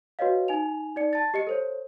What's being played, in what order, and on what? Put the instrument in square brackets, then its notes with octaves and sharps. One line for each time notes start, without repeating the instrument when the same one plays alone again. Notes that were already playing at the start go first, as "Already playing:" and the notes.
[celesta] F#4 B4 C#5 D#5 F5
D#4 G#5 F7
D#4 D5 C#7
A5 A6
G4 D#5 C#7
A4 C5 C#5